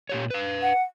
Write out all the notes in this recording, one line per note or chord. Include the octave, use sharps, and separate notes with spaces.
A#2 G4 C#5
B4 F5
F#5